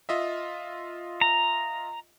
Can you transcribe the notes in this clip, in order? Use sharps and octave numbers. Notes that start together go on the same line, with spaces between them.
F4 D#5 E5
A#5